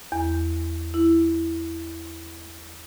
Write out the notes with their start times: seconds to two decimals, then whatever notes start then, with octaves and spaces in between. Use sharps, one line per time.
0.12 E2
0.94 E4